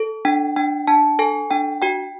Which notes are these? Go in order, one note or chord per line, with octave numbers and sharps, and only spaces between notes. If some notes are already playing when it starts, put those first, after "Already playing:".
Already playing: A4
D4 G5
D4 G5
D4 A5
A4 G#5
D4 G5
F#4 G5